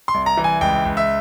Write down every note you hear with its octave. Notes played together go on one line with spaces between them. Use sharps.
C6
C2
A#5
E3
G#5
C#2 G5
C#2
E5